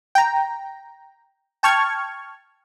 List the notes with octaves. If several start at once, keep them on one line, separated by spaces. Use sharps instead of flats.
G5 A#5
G5 A5 C#6 F6 G#6